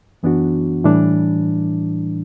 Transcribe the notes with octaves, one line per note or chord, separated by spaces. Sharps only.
F#2 E3 B3 D4 F#4
A2 E3 G3 D4